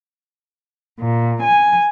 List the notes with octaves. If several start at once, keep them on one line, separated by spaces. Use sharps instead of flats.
A#2
G#5